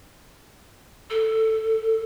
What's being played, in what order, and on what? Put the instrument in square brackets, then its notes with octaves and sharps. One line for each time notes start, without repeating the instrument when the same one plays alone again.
[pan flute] A4